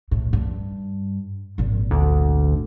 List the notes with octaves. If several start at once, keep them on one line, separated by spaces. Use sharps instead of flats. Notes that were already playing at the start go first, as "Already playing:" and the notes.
A2
G2
G#1 A#2
D2